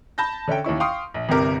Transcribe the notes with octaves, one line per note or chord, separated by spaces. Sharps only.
A5 B5 G6 A#6
D3 C#4 E5 G5
D#2 C#4 E4 C#6
F5 G5 C6 C#6 D#6
A#1
G1 C2 C3 G4 A#4 D6